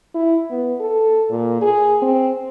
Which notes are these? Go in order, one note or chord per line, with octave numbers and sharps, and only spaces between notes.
E4
B3
A4
A#2
G#4
C4